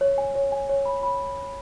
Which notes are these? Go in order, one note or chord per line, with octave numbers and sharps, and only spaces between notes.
C#5
G#5
C#5
G#5
C#5
B5
B5